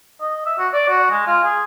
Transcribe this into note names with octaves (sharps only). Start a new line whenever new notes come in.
D#5
E5
F#4
D5
F#4
G#3
F4
G#4